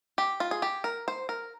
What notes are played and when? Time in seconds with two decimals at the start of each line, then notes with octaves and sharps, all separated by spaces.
0.18 G4
0.40 F4
0.51 G#4
0.62 G4
0.84 A#4
1.08 C5
1.29 A#4